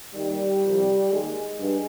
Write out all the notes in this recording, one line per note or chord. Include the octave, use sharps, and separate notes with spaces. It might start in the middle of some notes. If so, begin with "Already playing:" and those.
D#2 D#3 G3
C2 C3 F3
D#2 D#3 G#3
G2